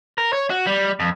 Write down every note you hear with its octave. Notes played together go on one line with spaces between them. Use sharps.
A#4
C#5
F#4
G3
F2